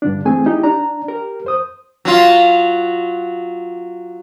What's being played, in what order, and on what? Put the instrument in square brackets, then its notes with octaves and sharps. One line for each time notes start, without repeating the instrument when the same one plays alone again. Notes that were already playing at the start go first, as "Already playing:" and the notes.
[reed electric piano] G2 D3 D4
E3 A3 C4 G#4 G#5
D#4 E4 G4
D4 D5 A#5
G4 A#4
F2 C5 D#6
[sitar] F#3 F4